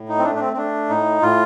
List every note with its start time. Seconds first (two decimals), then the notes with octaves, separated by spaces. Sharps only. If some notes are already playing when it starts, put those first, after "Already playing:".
Already playing: A2
0.09 D#4
0.18 C4
0.24 A3 D4
0.35 D4
0.40 C4
0.53 C4
0.56 A3 D4
0.89 A2 D#4
1.22 A2 F4